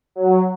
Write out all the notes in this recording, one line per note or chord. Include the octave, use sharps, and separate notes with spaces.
F#3